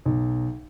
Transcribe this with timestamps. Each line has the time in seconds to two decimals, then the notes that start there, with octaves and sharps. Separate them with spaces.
0.05 B1